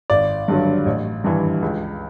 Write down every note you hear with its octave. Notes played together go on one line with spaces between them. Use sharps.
G#1 D5
G2 D3 F#3
A1
G2 E3
C#2